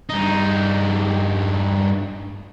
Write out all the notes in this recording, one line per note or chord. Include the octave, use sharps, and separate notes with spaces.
G2 D#4